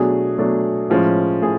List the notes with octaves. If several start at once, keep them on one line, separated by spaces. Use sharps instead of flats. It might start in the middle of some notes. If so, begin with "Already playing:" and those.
Already playing: B2 F#3 A3 D4 G#4
B2 F#3 A3 D4
A2 F3 G#3 C#4
A2 G#4